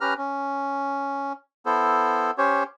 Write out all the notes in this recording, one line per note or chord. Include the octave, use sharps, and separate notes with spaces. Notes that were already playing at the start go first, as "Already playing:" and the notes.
C#4 G4 B4 A#5 F6
C#4
B3 E4 A4 C5
C#4 G4 C5 C#5